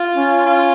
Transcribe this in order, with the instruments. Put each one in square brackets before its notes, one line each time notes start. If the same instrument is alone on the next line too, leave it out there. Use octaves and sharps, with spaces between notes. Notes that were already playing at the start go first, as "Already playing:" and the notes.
Already playing: [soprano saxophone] F4
[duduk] C#4
[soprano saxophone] F4